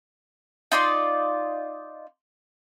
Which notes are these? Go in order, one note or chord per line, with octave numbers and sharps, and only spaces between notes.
D#4 F4 D5 C6